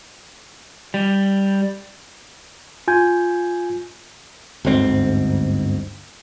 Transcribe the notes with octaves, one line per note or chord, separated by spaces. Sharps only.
G3
F4 G#5 G6 G#6
G1 D2 G#2 C4